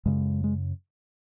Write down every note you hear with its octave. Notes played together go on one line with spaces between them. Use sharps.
F#2 C#3 G#3
G#3